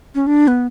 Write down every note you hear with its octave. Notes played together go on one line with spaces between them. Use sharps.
C#4
D4
B3